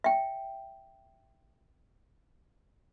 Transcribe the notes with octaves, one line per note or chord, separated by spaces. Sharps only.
E5 G5